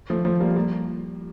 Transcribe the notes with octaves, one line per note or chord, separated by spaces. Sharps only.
F3 A3
F3 A3
G3 A#3
G3 A#3